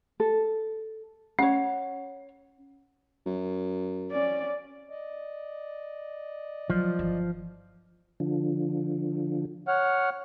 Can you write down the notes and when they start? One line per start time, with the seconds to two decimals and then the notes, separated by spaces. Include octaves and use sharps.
0.20 A4
1.39 C#4 C#5 F#5
3.26 F#2
4.11 C#4 D5
4.90 D5 D#5
6.70 F3 F#3 G#3
6.99 G1 E3
8.20 D3 F3
9.68 C#5 F#5 F6